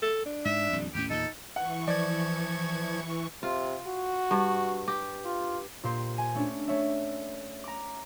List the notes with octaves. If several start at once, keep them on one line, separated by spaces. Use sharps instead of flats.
A4
D4
G#2 E5
D#1 F2 G3
D#2 A2 C#4 G4
E2 A#2 D#4 A4
E3 F#5 C#6
F3 D5 G#6
C3 F4
F#4
G2
G4
F4
A#2 G4 C5
G#5
A3 C#4 D4
A3 C#5 D5 E5
A#5 D6